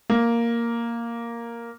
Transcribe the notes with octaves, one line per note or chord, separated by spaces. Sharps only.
A#3